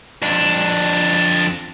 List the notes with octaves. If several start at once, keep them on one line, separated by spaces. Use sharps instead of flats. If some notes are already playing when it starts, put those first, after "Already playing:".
F2 D4